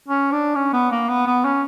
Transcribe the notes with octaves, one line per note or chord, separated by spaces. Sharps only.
C#4
D4
C#4
B3
A#3
B3
B3
C#4